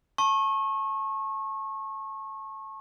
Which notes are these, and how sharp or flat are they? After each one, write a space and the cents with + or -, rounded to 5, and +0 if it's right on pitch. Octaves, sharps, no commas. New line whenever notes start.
A5 +0 C#6 -25